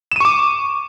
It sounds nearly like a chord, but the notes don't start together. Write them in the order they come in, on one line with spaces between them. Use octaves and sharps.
E7 D#7 C#6 D6